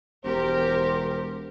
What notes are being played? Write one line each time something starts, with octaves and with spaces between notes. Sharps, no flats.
E1 G4 A#4 C5